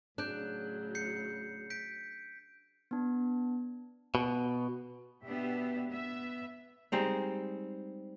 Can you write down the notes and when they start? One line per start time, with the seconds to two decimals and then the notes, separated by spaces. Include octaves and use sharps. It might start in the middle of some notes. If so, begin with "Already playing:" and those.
0.18 A2 C#3 F#3 D4 F#6 G6
0.95 G6 C7 C#7
1.70 G6 B6 D7
2.91 B3 D4
4.15 B2
5.23 B2 B3 D4 G4 E5
5.88 B3 E5
6.92 G3 G#3 C4 D#4